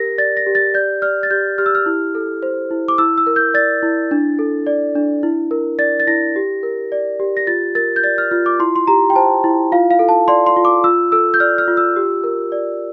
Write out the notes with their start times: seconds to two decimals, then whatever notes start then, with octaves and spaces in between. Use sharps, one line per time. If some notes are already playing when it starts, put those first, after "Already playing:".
Already playing: G4 A#4 A#6
0.18 D5 A6
0.37 A#6
0.46 G4
0.55 A6
0.74 D5 G6
1.02 D5 F6
1.23 A6
1.31 G4 G6
1.58 G4 F6
1.66 E6
1.75 F6
1.86 E4
2.15 A4
2.43 C5
2.71 E4
2.88 D6
2.98 E4 E6
3.18 E6
3.27 A#4
3.36 G6
3.54 D5 A6
3.82 E4
4.11 D4
4.39 A4
4.67 D5
4.95 D4
5.23 E4
5.51 A#4
5.79 D5 A6
6.00 A6
6.07 E4 A#6
6.36 G4
6.63 A#4
6.92 D5
7.20 G4
7.37 A#6
7.47 F4 A6
7.75 A#4 A6
7.96 G6
8.04 D5 A6
8.18 F6
8.31 F4 F6
8.46 D6
8.60 E4 C6
8.76 C6
8.87 G4 A#5
9.10 G5
9.16 C5 A5
9.44 E4
9.72 F4 F5
9.91 F5
9.99 A4
10.09 A5
10.28 D5 C6
10.46 C6
10.56 F4
10.65 D6
10.84 F4 E6
11.12 A4 E6
11.34 G6
11.40 D5 F6
11.58 F6
11.68 F4
11.77 E6
11.96 G4
12.24 A#4
12.52 D5